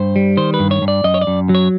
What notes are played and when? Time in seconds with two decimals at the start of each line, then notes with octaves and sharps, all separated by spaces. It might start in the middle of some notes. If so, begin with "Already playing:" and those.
Already playing: G2 C5
0.16 G3
0.37 D#3 C5
0.54 B4
0.59 G2
0.71 C#5
0.82 G2
0.88 D5
1.04 F#2 D#5
1.14 C#5
1.22 D5
1.27 F#2
1.49 F#3
1.55 C#5